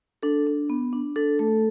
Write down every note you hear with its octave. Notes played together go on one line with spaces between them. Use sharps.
D4 A4
D4
B3
D4
D4 A4
A3 A4